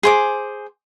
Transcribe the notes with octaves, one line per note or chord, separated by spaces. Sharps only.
G#4 C5 D6